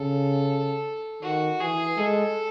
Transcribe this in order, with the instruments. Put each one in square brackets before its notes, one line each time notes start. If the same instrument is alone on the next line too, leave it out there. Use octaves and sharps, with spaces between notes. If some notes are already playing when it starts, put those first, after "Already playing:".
Already playing: [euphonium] C#3 [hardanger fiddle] A4
[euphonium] D#3 [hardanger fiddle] F#4
[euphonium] E3 [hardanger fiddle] G#4
[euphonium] G#3 [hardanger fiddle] A4